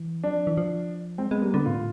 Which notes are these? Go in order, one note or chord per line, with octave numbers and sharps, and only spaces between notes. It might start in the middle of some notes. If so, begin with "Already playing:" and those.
Already playing: E3
F#3 D4
F3
E3
F3
G#3 C4
G#3 B3
G3 A#3
D3 B3
A2 F4